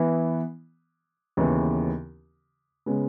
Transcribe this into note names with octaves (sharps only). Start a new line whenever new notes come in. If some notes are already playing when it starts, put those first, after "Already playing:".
Already playing: E3 B3 E4
D#2 C#3 E3 B3
C#3 G#3 B3